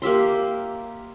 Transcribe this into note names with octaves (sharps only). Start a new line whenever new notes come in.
A#3 G4 E5 C6